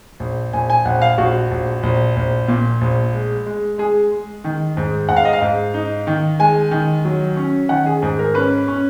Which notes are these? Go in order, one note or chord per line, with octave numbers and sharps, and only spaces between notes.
A#1
A#1 G#5
G#5
A#1 F#5
F5
A#1 F#4
A#1
A#1
A#1
A#2
A#1
G#3
G#3
G#3 G#4
G#3
D#3
G#2
G#2 F#5
F5
D#5
F5
G#2
D#4
D#3
G#3 G#5
D#3
F#3
C#4
D#3 F#5
G#4
G#2 G#4
A#4
C#4 B4
C#4